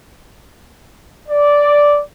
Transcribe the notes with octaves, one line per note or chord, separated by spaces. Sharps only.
D5